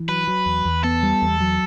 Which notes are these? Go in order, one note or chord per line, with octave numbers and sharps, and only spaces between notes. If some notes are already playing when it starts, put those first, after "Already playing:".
Already playing: E3
F#3 B4
F#3
E2
E2
B3 A4
G3
E2
F#3